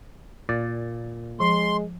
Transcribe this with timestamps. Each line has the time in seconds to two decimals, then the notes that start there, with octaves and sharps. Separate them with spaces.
0.49 A#2 D5
1.40 F3 G#3 C6